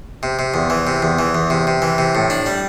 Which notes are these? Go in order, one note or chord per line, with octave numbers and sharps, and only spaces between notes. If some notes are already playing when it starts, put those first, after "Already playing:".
C3
C3
E2
E3
C3
E2
E3
E2
C3
C3
E3
C3
A2
D4
G3